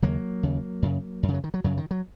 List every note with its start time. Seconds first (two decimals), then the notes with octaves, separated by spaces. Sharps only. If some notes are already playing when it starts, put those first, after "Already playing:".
0.02 D#2 C#3 F#3 A#3
0.43 D#2 C#3
0.82 F#2 C#3
1.23 F#2
1.28 C#3
1.34 F#3
1.44 D#3
1.54 F#3
1.64 F#2 C#3 F#3
1.77 D#3
1.91 F#3